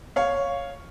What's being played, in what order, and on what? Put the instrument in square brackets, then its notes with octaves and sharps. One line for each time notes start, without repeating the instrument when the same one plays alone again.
[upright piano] C#5 F5